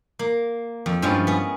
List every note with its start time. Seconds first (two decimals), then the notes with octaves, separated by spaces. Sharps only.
0.19 A#3
0.86 F2
1.02 G2 F3 G#3 C#4 E4
1.27 B3 G#4